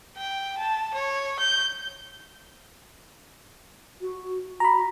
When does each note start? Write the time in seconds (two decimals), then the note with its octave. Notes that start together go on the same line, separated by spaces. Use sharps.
0.17 G5
0.57 A5
0.94 C#5
1.39 G6
4.01 F#4
4.60 F#4 A#5 B5